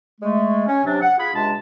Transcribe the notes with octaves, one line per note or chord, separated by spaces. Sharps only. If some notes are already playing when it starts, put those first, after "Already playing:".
G#3 A3
C#4
C3 F#3 D4
F#5
F4 G#4 B5
C#2 C3 G#3 D4 A5